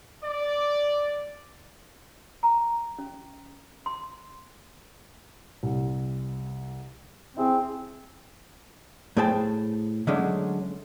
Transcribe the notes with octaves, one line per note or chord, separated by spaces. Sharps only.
D5
A#5
C#4
C6
C2
C4 E4 G#4 C5
A2 A3 G#4 C5 G5 A5
D3 F#3 G#3 A3 C#4 D4